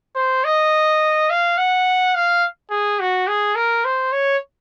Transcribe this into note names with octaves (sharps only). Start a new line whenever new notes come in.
C5
D#5
F5
F#5
F5
G#4
F#4
G#4
A#4
C5
C#5